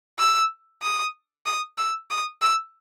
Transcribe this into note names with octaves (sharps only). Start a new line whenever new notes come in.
E6
D#6
D#6
E6
D#6
E6